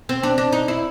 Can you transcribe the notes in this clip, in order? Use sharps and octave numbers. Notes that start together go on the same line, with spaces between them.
C4
D4
D4
D#4
E4